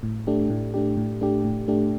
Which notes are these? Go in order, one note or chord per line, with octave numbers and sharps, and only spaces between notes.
A2
A3 D4 G4
A2
A3 D4 G4
A2
A3 D4 G4
A2
A3 D4 G4